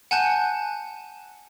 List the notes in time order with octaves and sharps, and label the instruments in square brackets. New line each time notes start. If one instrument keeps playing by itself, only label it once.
[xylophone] F#5 G#5 A5 F#6 G6